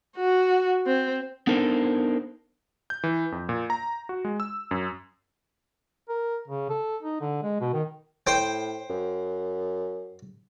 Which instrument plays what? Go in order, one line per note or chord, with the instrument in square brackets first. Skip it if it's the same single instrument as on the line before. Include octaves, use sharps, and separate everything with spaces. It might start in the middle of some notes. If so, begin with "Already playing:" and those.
[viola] F#4
C4
[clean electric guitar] B3 D4 D#4 A4 A#4 C5
[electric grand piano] G6
E3
F2
A#2
A#5
F#4
G#3
E6
F#2
[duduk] A#4
C#3
A4
D#4
D3
G#3
B2
D#3
[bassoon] A2 [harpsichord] C5 G5
[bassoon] F#2